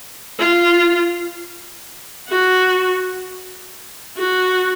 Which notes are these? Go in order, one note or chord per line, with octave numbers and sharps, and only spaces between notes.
F4
F#4
F#4